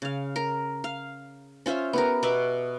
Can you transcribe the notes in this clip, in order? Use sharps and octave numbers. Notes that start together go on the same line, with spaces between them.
C#3 F5
A#4
F5
C#4 F4 C5 E5
B3 G4 A#4
B2 B3 E5 D6